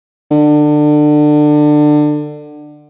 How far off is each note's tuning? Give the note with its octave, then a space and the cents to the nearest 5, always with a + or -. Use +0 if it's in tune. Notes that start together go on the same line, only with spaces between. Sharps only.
D3 +25